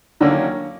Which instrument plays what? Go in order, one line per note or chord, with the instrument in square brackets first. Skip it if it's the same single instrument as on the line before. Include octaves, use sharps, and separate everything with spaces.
[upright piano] D3 [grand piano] D#3 F#3 A#3 C#4